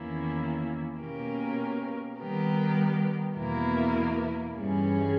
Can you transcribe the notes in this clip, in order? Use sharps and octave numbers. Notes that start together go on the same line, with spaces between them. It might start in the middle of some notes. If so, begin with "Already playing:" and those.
Already playing: E2 D#3 A#3 C#4 E4
B2 A#3 C#4 G4 A#4
D#3 G3 B3 G4 A#4
E2 B2 A#3 E4 A#4
G2 E3 G3 C#4 G#4